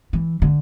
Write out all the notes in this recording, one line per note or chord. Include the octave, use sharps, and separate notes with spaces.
E3
D3